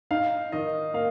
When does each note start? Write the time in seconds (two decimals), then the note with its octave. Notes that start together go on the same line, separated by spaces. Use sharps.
0.11 D#4 F5
0.52 D#3 D#5
0.94 A#3 F5